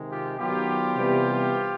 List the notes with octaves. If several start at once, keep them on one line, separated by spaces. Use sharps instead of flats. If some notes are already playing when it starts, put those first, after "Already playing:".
Already playing: C3 D#3 G#3
F4 G4
D#3 F#3 B3 F4 G4
C3 E3 G3 B3